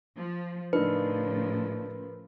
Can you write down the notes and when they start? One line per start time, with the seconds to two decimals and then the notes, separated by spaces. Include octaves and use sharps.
0.16 F3
0.73 A2 C#3 F3 D4 D#4 A#4 B4